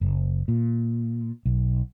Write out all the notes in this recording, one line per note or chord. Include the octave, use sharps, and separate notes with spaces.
F#1
A#2
B1